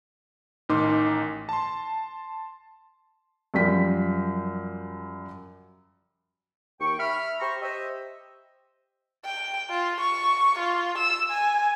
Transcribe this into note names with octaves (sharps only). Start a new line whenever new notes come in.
A1 D#3 D#4 A#4 C6 D6
A5 C6
F#2 F3 G3 G5 B6
D#2 G5 C#6
E5 B5 F6
G4 C5 A#5 C6 C#6
G4 C5 D#5 E5
G5
F4
C#6
F4
E6
G#5